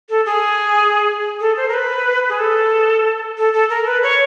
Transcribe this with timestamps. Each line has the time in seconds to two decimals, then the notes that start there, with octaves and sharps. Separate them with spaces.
0.09 A4
0.26 G#4
1.40 A4
1.57 C5
1.68 A#4
1.74 B4
2.29 G#4
2.39 A4
3.38 A4
3.53 A4
3.70 A#4
3.86 B4
4.03 C#5